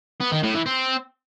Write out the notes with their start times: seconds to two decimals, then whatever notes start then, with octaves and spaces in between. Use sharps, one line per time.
0.21 B3
0.32 D#3
0.43 A2
0.55 E3
0.66 C4